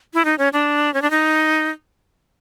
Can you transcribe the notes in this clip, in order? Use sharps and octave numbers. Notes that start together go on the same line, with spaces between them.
E4
D#4
C#4
D4
C#4
D4
D#4